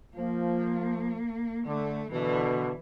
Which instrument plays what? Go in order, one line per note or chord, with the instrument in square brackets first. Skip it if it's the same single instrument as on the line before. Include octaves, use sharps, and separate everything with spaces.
[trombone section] F3 [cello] A#3
[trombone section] D3 [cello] A3
[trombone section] B2 D3 [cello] E3